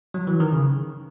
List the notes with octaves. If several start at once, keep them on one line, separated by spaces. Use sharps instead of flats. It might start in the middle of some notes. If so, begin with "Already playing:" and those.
F#3
E3
D#3
C#3